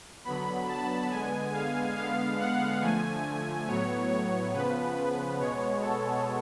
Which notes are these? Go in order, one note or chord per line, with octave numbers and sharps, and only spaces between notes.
D3 F#3 B3 B5
A5
D3 G#3 B3 G#5
F5
D3 G#3 B3 F5
F#5
D3 F3 A3 G#5
A2 F#3 B3 C#5
C#5
C#3 F3 B3 B4
B4
B2 G#3 B3 C#5
A4